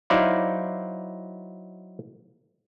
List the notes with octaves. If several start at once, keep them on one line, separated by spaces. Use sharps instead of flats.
F#3 D#4 E4 C5 D5 F5